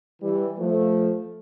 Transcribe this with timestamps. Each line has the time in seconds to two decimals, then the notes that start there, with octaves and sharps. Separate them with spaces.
0.21 E3 G3
0.58 F3 A3